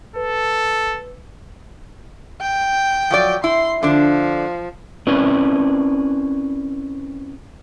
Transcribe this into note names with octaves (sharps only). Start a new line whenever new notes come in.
A4 B4
G5
F3 F#3 D5
E4 C6
D3 F3 D4
C4 C#4 E4 A#4 B4 D5